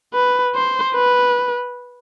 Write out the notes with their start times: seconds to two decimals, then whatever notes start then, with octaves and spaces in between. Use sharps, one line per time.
0.14 B4
0.54 C5
0.95 B4